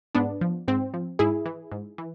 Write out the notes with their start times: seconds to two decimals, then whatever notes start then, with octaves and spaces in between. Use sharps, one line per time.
0.15 G#2 B3 D4
0.41 F3
0.68 G#2 C4
0.94 F3
1.19 G#2 E4 G#4
1.46 E3
1.72 G#2
1.98 E3